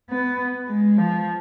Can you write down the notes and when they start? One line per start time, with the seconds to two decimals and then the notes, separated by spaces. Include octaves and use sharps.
0.10 B3
0.69 G#3
0.97 F3